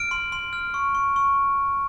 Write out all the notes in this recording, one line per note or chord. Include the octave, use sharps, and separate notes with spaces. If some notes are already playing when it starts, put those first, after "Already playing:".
Already playing: F6 D7
C6
C6
F6
C#6
C#6
C#6